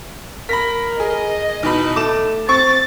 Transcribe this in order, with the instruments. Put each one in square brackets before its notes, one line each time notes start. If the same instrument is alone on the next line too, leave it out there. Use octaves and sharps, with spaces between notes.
[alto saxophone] A#4 [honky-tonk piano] B5 A#6 B6
[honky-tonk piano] G#4 [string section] D#5
[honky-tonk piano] E2 B2 B5 [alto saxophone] D#4
[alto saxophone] A3 [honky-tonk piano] D6 E7
[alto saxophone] C4 [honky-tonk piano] C#6 [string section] A6